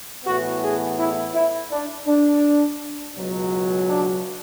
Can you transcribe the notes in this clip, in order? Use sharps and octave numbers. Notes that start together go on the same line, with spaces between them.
A2 E3 B3 F#4
G#4
E4
E4
D4
D4
C#2 B2 F#3
D4